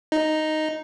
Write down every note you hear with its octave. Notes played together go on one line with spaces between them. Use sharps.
D#4